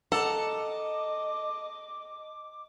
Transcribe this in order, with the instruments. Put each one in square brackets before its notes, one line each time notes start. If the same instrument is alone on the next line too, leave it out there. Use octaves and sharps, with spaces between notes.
[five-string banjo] A4 F#5 [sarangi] D#5 [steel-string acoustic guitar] A5 A#5 [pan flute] D6